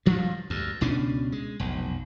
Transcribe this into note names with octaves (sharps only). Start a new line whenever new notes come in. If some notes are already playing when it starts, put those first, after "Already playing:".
G2 F3 G3
D2 G2
C#2 B2 C#4 D4
G#3
F1 B1